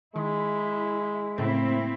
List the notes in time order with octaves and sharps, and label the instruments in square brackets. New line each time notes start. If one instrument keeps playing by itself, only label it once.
[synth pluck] D#3 [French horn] G#3 [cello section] E4
[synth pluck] A2 C#3 A3 [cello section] A#3 C4 E4